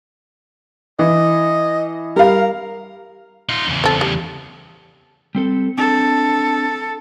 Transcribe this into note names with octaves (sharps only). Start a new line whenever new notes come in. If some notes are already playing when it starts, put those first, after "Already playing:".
E3 D#5
G3 A#4 F5
D#4 F4
E2 C#3
C4 A4
G3
G3 C4 A4
C4 D4 A4